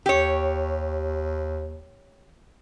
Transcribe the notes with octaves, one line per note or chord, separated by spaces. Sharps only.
D#2 G4 C#5